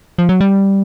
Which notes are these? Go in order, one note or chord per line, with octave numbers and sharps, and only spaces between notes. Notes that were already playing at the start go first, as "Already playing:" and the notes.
F3
F#3
G3